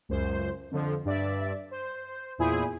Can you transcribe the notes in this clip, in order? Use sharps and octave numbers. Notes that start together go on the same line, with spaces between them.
C#2 F#2 C5
F2 D3 F3
G2 D5 E5
C5
E2 A#2 E4 G#4 C5 G#5